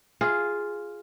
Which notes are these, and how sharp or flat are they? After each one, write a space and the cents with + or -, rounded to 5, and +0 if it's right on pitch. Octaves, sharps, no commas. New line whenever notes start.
F4 +0 G#4 +0